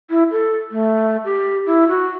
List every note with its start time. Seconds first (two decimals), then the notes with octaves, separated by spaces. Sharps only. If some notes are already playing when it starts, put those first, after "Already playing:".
0.10 E4
0.31 A4
0.72 A3
1.25 G4
1.66 E4
1.89 F#4